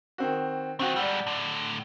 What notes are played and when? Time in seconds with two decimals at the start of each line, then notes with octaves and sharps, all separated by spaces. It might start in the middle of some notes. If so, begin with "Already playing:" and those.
0.18 D#3 C4 F#4
0.79 D#3 C4 F4 F#4
0.96 G#2 G3 D5 F#5 E6
1.27 A2 D3